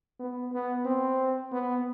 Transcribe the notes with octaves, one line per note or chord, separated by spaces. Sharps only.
B3
B3
C4
B3